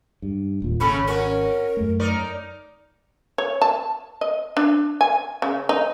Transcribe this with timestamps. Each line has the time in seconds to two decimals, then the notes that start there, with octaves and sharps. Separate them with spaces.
0.22 G2
0.62 D#1 A#2
0.80 G#1 C#3 C#4 A4 B5
1.07 C#4 F#4 A#4
1.77 F#2 A3
2.00 D#4 A#4 D5
3.38 C#5
3.62 A5
4.21 D#5
4.57 D4
5.01 G#5
5.42 C#3
5.69 D#4